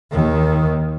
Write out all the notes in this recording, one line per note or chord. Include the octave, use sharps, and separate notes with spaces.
D#2 D#3